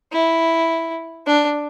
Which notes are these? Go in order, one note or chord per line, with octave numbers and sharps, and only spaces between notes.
E4
D4